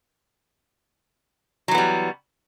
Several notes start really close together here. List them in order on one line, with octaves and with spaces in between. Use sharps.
F#3 E3 B3 G3